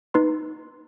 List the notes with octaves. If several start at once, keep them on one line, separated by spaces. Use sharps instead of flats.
D#4 B4 C6